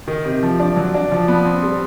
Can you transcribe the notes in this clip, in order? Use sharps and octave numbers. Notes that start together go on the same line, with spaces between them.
D#3
C3
F3
D4
F#3
D4
F3
B3
C4
G3